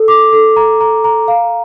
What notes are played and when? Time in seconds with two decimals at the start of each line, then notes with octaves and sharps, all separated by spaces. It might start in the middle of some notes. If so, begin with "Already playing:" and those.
Already playing: A4
0.08 D6
0.33 A4
0.56 A#5
0.81 A#5
1.04 A#5
1.28 F5